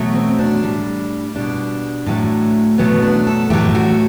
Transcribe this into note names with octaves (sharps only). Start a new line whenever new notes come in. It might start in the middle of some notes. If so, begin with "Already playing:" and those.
Already playing: B2 F#3 A3
C4
D4
A2 G3
B2 G3 D4
A2 F#3 A3
B2 F#3 A3 B3
D4
A4
A2 F#3 A3 G4
F#4